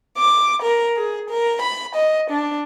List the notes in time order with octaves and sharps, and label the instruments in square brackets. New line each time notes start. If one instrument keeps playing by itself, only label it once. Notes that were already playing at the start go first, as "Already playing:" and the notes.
[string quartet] D6
A#4
G#4
A#4
B5
D#5
D4